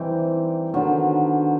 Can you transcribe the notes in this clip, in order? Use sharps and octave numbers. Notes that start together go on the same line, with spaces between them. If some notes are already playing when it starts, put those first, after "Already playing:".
Already playing: E3 G3 C4 D#4
D3 D#3 F#3 B3